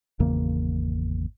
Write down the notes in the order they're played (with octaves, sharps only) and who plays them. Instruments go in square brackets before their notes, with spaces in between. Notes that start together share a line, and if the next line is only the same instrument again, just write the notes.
[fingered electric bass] G#1 E2 C#3 A#3